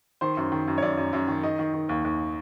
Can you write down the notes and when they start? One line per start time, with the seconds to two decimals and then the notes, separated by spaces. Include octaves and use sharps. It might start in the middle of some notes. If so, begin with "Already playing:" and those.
0.21 D#3 C5
0.37 F#2
0.52 D#3
0.67 F#2
0.78 C#5
0.82 F#2 D5
0.97 F#2
1.13 F#2
1.28 D#3
1.43 D#3 D#5
1.59 D#3
1.74 D#3
1.89 D#2
2.04 D#2